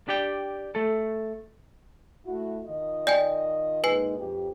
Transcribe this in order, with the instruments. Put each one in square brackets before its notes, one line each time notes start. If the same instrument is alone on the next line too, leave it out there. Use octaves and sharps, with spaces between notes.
[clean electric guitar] D4 G4 D5 G5
A3 A4
[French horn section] A3 E4 F#4
D#3 F4 D#5
[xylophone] D5 G5 G#5
[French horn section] A#2 G#3 D#4 [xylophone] B4 G#5 C7
[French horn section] F2 G4